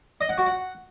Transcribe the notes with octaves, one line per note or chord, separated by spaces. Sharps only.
D#5
F#5
F#4
F#5